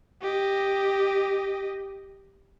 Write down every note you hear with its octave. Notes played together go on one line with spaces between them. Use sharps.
G4 D#5